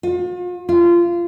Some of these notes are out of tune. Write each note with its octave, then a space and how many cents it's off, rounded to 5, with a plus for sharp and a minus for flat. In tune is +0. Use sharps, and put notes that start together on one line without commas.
F4 +40
F4 -20